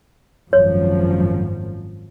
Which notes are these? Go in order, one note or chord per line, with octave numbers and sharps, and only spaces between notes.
G#1 F#2 F3 C#5